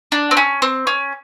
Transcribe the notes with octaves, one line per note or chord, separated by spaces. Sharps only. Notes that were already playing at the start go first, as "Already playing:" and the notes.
D4
C4
C#4
C4
C#4